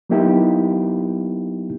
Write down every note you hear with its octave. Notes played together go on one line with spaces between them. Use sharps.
F#3 A#3 B3 D#4 E4 G4